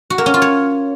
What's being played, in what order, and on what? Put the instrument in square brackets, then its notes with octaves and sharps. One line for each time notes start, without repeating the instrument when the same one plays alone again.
[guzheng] F#4
A#3
C#4
F4
C#5